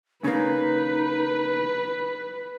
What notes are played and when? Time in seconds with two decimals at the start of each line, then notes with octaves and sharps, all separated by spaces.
0.24 C#3 A#3 D#4 B4